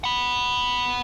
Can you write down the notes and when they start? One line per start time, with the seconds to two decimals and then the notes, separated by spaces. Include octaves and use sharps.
0.04 F#5 B5